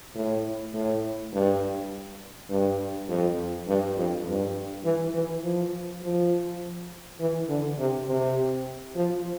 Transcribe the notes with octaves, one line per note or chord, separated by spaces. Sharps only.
A2
A2
G2
G2
F2
G2
F2
G2
E3
E3
F3
F3
E3
D3
C3
C3
F3